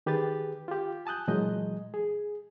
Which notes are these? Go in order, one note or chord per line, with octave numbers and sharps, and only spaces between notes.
D#3 G4 G#4 B4 A6
F4 G4
G#5 A5 D#6 F#6 G6
A#2 E3 F#3 G#3 D#5
G#4